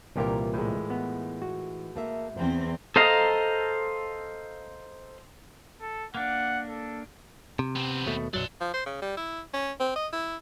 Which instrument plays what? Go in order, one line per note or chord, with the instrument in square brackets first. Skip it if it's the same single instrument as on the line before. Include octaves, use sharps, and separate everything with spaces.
[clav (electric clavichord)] C2 A#2 G4 [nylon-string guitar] E3 F4 A#4
[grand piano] A2 G#3
[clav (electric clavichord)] B3
F#4
[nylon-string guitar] A3 A#3 E5
[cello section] E2 C4 [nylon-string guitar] C5
[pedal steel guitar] A4 C5 D#5 F5 A#5
[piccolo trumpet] A4
[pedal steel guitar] A#3 D4 [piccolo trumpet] F#5
[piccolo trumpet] A4
[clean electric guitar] C3
[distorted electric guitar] B3 C4
[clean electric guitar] D#2 B2 A3
[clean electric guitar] B1 F#2 F#3 [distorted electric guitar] D5 C6
[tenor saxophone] F3
C5
C#3
G3
E4
C#4
C4
D#5
E4